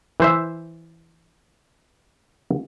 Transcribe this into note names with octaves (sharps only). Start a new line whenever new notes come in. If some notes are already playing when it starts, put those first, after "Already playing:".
E3 C5 E5